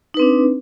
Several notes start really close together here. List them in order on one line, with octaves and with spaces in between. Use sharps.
D#4 B4 C4 D4